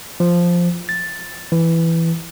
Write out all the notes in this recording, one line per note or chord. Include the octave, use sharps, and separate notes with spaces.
F3
A6
E3